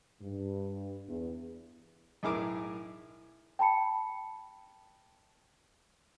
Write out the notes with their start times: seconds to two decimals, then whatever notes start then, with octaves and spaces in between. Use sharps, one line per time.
0.22 G2
1.08 E2
2.23 B1 A2 E4 G#4 A#4 D6
3.59 G5 A5 B5 C#7